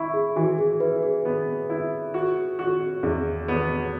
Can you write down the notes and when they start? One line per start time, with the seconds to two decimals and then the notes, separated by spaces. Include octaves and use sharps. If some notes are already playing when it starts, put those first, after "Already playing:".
Already playing: E4 B5 C#6
0.14 G#4
0.36 E3 F#4
0.58 G#4
0.80 E4 B4
1.03 G#4
1.25 B3
1.70 E4
2.14 F#4
2.59 F#4
3.03 E2 G#4
3.48 B3